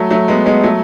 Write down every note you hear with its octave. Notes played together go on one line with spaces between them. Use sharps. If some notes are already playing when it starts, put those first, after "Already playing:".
Already playing: F#3 A3
F#3 A3
G#3 B3
G#3 B3
F#3 A3